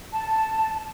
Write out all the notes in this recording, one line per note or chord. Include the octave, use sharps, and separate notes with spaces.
A5